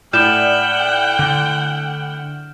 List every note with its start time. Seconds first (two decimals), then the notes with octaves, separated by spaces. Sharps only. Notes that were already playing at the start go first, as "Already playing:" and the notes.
0.13 A2 D5 F#5 G5 F6 G6 E7
1.19 D3